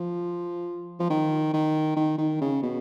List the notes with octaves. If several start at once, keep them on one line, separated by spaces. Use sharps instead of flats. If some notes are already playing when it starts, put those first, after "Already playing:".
Already playing: F3
F3
D#3
D#3
D#3
D#3
C#3
B2